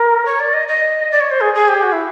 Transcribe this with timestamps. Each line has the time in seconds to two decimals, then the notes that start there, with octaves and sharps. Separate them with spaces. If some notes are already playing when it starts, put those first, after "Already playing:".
Already playing: A#4
0.25 C#5
0.39 D5
0.53 D#5
0.68 D#5
1.11 D5
1.20 C#5
1.30 C5
1.40 G#4
1.54 G#4
1.68 G4
1.82 F#4
1.92 E4